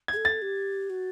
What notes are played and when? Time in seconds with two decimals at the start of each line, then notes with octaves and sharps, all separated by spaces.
0.08 G#4 G#6
0.17 A4
0.25 A6
0.42 G4
0.90 F#4